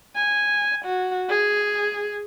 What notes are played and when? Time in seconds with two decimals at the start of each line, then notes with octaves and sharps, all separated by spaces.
0.15 G#5
0.85 F#4
1.29 G#4